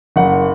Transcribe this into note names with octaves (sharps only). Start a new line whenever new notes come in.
F#1 F#5